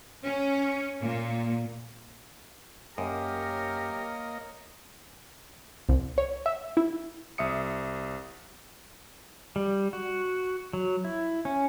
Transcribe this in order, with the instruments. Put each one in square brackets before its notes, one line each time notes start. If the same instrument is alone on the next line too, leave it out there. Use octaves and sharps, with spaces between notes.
[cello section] C#4
A#2
[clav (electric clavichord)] F#2 [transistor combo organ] A#3 D#5 [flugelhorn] G4 [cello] A#4 C#5
[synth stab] C2
C#5
E5
E4
[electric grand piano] C2 E5 D#6 C#7
[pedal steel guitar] G3
F#4
F#3
E4
C#4